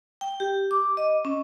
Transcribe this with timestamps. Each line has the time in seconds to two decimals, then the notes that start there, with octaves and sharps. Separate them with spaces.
0.21 G5
0.40 G4
0.71 D6
0.97 D#5
1.25 C#4